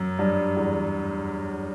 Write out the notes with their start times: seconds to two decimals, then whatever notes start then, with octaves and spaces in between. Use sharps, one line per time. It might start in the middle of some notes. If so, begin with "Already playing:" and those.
Already playing: F#2
0.19 G2
0.57 E2